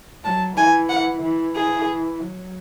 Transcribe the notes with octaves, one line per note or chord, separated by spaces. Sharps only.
F#3 A5
E3 G#5
F#5
E3
G#4
F#3